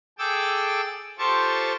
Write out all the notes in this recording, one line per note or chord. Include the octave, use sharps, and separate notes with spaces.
G#4 A4 G5 D6 E6
F4 G4 A4 C5 A5 C#6